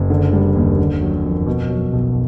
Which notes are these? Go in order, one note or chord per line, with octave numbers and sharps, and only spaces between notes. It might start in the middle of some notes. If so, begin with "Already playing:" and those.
Already playing: F#1
D3
G3
D#2
D3
F#3
F2
B2
F#3
B1